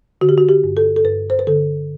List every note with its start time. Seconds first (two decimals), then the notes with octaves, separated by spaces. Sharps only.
0.21 D3 F#4
0.29 G4
0.38 F#4
0.49 G4
0.64 G2
0.77 A4
0.96 A4
1.05 G2 B4
1.30 C5
1.39 B4
1.47 D3 A4